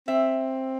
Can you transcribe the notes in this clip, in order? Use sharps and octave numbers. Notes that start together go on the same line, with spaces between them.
C4 E5